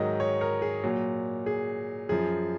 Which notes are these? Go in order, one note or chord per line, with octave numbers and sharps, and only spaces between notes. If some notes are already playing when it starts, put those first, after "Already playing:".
Already playing: G#2 D#3 F#3 D#5
C#5
A#4
G#4
A#2 F#3
G#4
F#2 F3 G#4